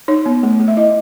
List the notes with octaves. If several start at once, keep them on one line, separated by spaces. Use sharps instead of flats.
D#4 C#5
B3
A3
A3
E5
E4 D#5